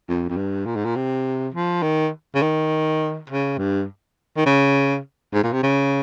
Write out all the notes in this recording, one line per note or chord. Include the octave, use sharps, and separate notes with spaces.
F2
F2
G2
A#2
G#2
A#2
C3
F3
D#3
C#3
D#3
C#3
G2
D#3
C#3
G#2
A#2
C3
C#3